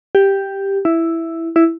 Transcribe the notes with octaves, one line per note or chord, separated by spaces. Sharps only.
G4
E4
E4